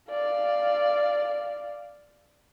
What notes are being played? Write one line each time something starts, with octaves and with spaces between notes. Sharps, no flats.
D5 F5